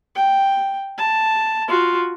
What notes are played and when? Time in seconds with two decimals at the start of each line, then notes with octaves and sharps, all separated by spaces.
0.16 G5
0.98 A5
1.68 F4 F#4